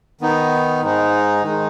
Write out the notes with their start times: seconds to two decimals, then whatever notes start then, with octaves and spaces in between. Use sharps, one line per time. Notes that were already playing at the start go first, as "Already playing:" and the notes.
0.21 D#3 B3 D#4
0.82 G#2 G#3 D#4
1.43 D#3 G#3 D#4